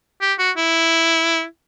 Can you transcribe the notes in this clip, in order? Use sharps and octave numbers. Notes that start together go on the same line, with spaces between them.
G4
F#4
E4